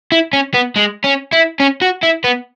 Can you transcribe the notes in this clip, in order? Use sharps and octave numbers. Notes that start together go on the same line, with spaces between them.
E4
C#4
B3
G#3
C#4
E4
C#4
F#4
E4
B3